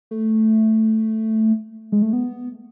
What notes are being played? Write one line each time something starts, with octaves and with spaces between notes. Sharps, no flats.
A3
G#3
A3
B3